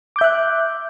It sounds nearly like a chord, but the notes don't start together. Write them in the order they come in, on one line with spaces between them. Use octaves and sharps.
D6 G6 E5 F#6